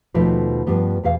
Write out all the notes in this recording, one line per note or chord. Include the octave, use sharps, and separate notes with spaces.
D#2 B2 F3 A3 D#4 B4
G2 F3 G3 B3
E2 B2 F5